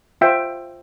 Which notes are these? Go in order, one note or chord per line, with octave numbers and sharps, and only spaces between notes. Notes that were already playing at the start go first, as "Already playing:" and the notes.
F4 C5 E5 G5